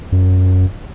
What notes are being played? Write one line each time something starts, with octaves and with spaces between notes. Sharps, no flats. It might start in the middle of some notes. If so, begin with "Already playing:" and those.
F#2